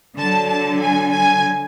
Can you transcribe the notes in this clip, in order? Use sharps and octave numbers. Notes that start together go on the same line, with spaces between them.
D3 F#3 A5
A5
G#5
G#5